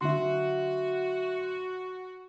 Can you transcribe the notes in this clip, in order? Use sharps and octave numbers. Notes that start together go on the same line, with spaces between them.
D3 F#3 F#4 E5 C6